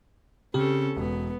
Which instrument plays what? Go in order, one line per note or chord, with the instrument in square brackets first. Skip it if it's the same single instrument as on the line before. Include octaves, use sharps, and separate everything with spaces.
[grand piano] C#3 [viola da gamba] C4 C#4 A4 [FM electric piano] G4
[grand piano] E1 [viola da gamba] B3